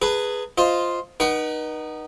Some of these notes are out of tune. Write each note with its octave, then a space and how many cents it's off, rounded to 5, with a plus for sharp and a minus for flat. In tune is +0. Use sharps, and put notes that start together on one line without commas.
G#4 +0 B4 +0 A5 +45
F4 +0 C5 +0 D#5 +10
D#4 -15 B4 -45 F#5 +25